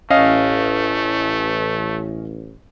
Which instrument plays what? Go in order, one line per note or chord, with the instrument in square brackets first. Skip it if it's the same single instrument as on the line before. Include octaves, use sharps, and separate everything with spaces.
[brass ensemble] A1 [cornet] A3 [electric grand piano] C#4 D#5 F5